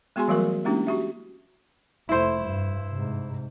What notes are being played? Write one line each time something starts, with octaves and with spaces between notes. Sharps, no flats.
G#3 B3 F#4 G#4 G#5 C6
E3 F#3 G3 A3 F#4 A#4
G#3 A#3 C#4 D4 E4 G4
F#4 G4 E5
F1 A3 E4 C5
G2
G#2 C3